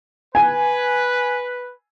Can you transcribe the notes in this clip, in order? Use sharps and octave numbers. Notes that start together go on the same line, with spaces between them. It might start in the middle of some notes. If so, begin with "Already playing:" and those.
B4 G#5